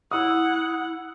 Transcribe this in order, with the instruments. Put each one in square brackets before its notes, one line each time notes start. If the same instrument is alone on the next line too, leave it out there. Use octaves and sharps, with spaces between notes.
[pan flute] E4 [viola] F#5 [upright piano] D#6 E6